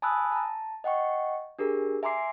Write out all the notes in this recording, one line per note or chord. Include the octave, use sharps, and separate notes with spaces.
G#5 A5 B5 D#6 E6 F#6
A5 A#5
D#5 F#5 G5 C#6
D4 G4 G#4 A#4
E5 G#5 A#5 C6 D6 C7